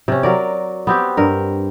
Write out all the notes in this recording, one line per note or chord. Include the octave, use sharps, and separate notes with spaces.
C3 C#4
F#3 A#4 D5
B3 C4 G4
G2 A#4